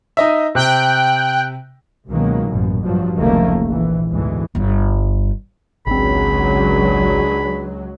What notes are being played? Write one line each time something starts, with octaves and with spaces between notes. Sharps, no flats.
D#4 D#5 E5
C3 G5 F#6
C#2 B2 D#3 F#3 G#3 A#3
A1 F#2 B2
G2 F3 F#3
F1 C#2 D#3 F3 A3 A#3
A#1 E3
D2 G#2 B2 E3
G1 G3
G#1 C#2 F#3 C4 D4 G#4 B5